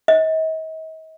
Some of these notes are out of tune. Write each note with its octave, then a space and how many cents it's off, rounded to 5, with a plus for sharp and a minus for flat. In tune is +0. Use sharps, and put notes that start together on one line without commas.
D#5 +40